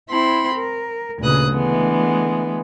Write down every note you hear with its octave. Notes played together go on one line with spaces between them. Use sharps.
C4 E4 B5 C6
A#4
D2 A#2 C#3 B4 D#6 F#6
D3 E3 G#3 A3 B3